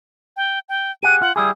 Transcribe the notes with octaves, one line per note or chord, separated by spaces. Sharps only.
G5
G5
G4 G#4 F#5 D#7
F4 F#5
G3 E4 G#4 D#6